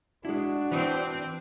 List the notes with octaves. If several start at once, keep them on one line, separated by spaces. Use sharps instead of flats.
G#3 D4 E4 F#4
E3 C4